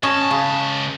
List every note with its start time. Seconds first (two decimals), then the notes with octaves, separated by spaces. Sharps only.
0.03 C#2 C#4 C#5 D#5 A5
0.31 C#3